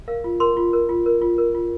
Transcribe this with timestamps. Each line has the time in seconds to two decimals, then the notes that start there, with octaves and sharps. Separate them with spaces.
0.08 A#4 F5
0.24 F4
0.40 A#4 C6
0.57 F4
0.73 A#4
0.89 F4
1.06 A#4
1.22 F4
1.38 A#4
1.55 F4